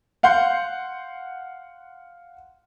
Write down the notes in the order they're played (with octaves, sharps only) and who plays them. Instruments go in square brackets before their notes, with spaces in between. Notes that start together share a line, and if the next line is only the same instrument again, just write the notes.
[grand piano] F5 F#5 C6 G6